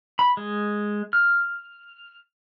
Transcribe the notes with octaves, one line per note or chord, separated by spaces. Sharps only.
B5
G#3
F6